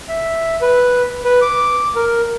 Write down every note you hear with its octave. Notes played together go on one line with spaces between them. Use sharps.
E5
B4
B4
D6
A#4